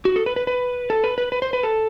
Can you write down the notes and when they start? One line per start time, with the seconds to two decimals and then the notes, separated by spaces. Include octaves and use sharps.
0.05 F#4
0.16 A4
0.26 B4
0.36 B4
0.47 B4
0.90 A4
1.04 B4
1.18 B4
1.32 B4
1.42 C5
1.53 B4
1.63 A4